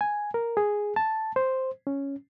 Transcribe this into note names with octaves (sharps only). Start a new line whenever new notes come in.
G#5
A#4
G#4
A5
C5
C#4